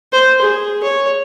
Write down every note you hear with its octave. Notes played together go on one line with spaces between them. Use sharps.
C5
G#4
C#5